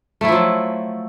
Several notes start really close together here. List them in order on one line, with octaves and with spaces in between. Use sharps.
A3 E4 F3 F#3